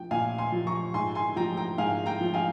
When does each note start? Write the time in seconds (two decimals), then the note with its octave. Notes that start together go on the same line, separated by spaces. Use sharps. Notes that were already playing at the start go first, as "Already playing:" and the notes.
Already playing: F3 G5
0.11 A#2 F5 G#5
0.38 G#5 C6
0.52 F3
0.67 A#5 C#6
0.94 G#2 G#5 C6
1.15 G#5 C6
1.36 F3 G5 A#5
1.57 G5 A#5
1.78 G#2 F5 G#5
2.06 G5 A#5
2.21 F3
2.34 F5 G#5